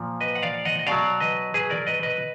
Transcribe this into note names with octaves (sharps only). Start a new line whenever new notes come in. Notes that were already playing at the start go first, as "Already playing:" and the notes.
Already playing: A#2 F3
B4 D#5
F#5
D5 F5
D#5 F#5
D#5
B2 F#3 D5 F5
B4 D#5
G#4 B4
A#4 D5
B4 D#5
B4 D#5